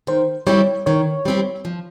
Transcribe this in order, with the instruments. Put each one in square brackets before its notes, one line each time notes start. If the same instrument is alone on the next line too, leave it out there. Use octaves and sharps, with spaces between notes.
[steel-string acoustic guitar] D#3 [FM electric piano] C5
[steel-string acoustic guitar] G3 C4 E4 G4 [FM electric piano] C#5
[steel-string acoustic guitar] D#3 [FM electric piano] C#5
[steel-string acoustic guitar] G3 C4 E4 G4
F3